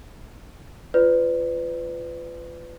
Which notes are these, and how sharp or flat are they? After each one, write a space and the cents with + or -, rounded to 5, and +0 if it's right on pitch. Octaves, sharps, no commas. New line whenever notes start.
F4 -15 B4 +30 D5 -15